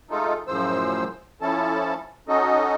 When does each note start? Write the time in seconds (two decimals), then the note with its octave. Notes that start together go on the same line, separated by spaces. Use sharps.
0.10 G#3 A3 D#4 F4 A4
0.48 F#2 A2 C#3 F3 C5 E6
1.42 F3 C#4 E4 A4 A5
2.28 C#4 D#4 F#4 A4 D#5